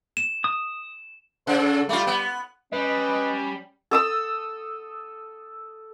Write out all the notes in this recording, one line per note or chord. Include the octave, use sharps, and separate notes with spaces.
E7
D#6
C#3 C5
A4
G3 A3 F4
B3
G3 C#4 B4 D#5
A4 D#6 E6